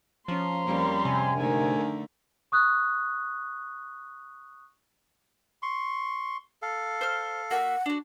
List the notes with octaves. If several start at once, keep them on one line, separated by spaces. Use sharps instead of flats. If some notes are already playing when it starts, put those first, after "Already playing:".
F3 C#4 A#5 C6
F2 G3 A#3 C#4
G#2 C3 G#5
D3 D#3 A3 A#4
C#6 D#6 F#6
C6 C#6
A4 F5
C5 F6
A#3 F#4 E5 F#5
D4 F#4